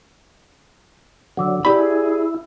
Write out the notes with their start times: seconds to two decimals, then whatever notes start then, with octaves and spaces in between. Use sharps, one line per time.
1.37 D3 F#3 F#5 D6 E6
1.65 E4 G4 G#4 D5 B5